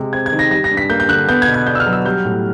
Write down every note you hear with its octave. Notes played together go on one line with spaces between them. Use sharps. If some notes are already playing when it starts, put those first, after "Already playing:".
Already playing: C3 G#3
C4 G#6
G#6
D#3
A#6
G3 A#6
A#6
G2
B6
A#3 G6
G6
D3 F#6
B3 G6
G#6
B2
G#6
D4 G6
E6
F6
F#3
E6
G3 G6
A2